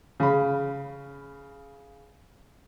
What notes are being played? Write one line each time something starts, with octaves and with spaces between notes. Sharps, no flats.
C#3 B5